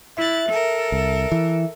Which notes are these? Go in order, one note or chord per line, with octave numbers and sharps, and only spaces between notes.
E4 E5 F#6 A6
A4 A#4
C2
E3